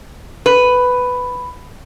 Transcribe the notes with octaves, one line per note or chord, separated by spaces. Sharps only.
B4